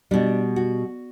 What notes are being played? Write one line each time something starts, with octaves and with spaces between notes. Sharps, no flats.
B2 G3 D4
F#4